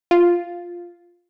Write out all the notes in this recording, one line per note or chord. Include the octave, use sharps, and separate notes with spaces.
F4